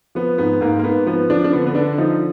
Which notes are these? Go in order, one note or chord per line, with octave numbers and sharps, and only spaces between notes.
F3 B3
G#2 B3
G#2 A#3
A#3
G#2 B3
F3 B3
F3 D4
D4
D3 B3
B3
D3 D4
F3 D#4